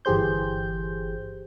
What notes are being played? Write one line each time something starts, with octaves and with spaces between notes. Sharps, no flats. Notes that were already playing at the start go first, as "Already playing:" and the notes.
G1 E3 G4 G#4 C5 G6